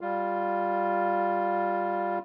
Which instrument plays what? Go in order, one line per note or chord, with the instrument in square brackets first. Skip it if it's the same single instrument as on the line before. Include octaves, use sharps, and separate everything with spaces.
[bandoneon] G3 F4